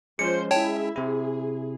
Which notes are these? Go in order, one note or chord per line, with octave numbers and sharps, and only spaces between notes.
F3 G#3 C#4 C5 C#7
E4 G#4 C#5 E5 G5 A5
C3 E4 G#4